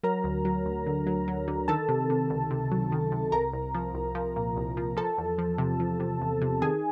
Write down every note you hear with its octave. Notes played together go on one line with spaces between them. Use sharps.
F#3 A#4 A#5
D2
F#3
D2
D3
F#3
F#3
D3
D#3 A4 A5
C3
C3
C#2
C3
F#3
D#3
C3
C2 A#4 A#5
C2
F3
C2
F3
A#2
C2
F3
F3 A4 A5
E2
F3
C3
F3
C3
E2
C3
D#3 G#4 G#5